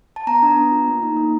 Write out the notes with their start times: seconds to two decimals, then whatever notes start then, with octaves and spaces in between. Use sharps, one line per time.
0.16 A5
0.27 B3 A#5
0.42 D4
0.56 B3
0.72 F4
0.88 A#3
1.03 D#4
1.17 A#3